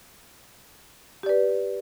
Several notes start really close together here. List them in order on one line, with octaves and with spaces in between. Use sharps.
G4 D5 B4